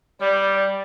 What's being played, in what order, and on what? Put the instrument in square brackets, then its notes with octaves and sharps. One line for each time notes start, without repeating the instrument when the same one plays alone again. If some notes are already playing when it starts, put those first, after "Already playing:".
[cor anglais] G3 [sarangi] D5